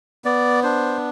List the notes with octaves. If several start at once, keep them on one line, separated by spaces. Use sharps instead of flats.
B3 D5
D4 C5